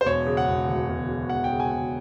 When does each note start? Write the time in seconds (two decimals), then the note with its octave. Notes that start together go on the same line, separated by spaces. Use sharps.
0.01 C5
0.05 E1 C#5
0.26 C#3
0.37 F#5
0.48 E1
0.67 D2
0.89 E1
1.09 C#3
1.29 E1 F#5
1.44 G5
1.49 C#3
1.60 G#5
1.71 E1